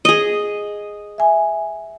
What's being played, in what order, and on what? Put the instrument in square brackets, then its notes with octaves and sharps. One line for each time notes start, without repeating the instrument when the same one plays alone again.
[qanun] G#4 D#5
[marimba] E5 G#5